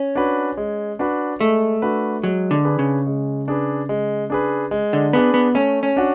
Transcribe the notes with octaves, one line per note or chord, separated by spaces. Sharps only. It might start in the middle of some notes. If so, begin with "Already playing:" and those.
Already playing: C#4
D4 F#4 B4
G#3
D4 F#4 B4
G#3 A3
D4 F#4 B4
F#3 G#3
D3
D4 G#4 B4
C#3
G#3
D4 G#4 B4
G#3
D4 G#4 B4
G#3
D3
B3 D4 G#4 B4
B3
A3 C#4
C#4
D4 F#4